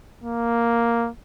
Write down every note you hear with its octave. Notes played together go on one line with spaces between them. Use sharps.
A#3